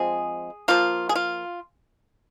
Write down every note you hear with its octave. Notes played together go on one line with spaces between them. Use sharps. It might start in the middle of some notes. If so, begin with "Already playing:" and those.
Already playing: F3 G#3 C4 G#4
F3 A#3 F4
G#4
F4